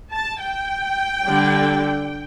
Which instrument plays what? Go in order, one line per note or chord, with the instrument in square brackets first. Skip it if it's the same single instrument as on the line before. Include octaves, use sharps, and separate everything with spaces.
[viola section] A5
G5
D3 G3 D4